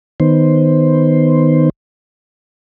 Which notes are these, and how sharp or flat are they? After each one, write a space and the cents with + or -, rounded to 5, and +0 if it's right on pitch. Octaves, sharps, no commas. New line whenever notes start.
D#3 +0 B3 +10 C5 +5